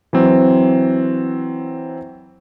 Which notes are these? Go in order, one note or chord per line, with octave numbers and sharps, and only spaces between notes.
E3 F#3 C4